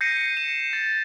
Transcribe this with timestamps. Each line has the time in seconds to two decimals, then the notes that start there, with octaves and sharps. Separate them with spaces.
0.01 G6 A#6 C7 C#7 D#7
0.37 E7
0.73 A6